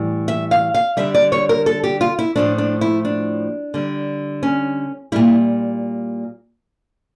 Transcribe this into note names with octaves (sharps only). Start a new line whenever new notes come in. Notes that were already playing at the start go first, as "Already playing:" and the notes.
Already playing: A2 E3 G3
E5
F5
F5
D3 G3 E5
D5
C#5
A#4
A4
G4
F4
E4
A2 F3 A3 D4
D4
E4
D4
D3 G3
C#4
A#2 G3 E4